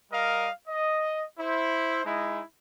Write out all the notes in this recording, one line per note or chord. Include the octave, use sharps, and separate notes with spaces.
G3 A#4 D#5 F5
D#5
E4 C5
G#3 D#4 E4